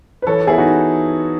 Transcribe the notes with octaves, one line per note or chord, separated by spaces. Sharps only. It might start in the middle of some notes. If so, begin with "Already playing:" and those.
B4
E3 A4 C#5
B3 E4 G#4
D#4 F#4